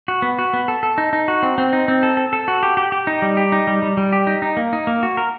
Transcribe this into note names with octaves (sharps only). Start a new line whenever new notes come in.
F#4
B3
F#4
B3
A4
A4
D#4
D#4
F#4
C4
C4
D#4
C4
A4
A4
A4
F#4
G4
G4
G4
D#4
G3
G4
D#4
G3
G3
G3
G4
D#4
D#4
A#3
D#4
A#3
F#4
A#4